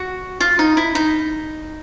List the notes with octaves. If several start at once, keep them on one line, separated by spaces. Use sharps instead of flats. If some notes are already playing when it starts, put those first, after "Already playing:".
Already playing: F#4
F4
D#4
E4
D#4